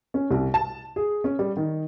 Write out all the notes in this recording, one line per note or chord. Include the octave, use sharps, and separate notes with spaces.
C#4
C2
A5
G#4
C#4
G3
D#3